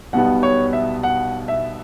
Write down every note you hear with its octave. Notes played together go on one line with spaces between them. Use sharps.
B1 B2 G3 B3 F#5
C#5
E5
F#5
E5